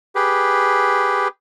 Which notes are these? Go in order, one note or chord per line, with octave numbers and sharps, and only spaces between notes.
G4 G#4 B4